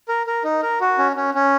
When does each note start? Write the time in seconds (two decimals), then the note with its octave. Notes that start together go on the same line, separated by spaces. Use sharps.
0.08 A#4
0.27 A#4
0.44 D#4
0.62 A#4
0.81 F#4
0.98 C#4
1.16 C#4
1.34 C#4